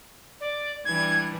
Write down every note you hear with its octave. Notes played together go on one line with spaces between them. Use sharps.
D5
E3 G3 D4 G#6